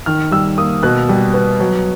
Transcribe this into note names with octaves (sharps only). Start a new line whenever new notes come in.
D#3 F6
G3 E6
A#3 D#6
B2 F#6
G3
B3
F#3